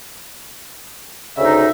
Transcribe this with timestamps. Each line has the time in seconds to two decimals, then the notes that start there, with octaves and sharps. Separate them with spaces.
1.38 D2 C#3 D#4 E5